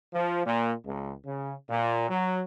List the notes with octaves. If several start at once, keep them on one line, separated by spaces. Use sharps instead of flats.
F3
A#2
C#2
C#3
A#2
F#3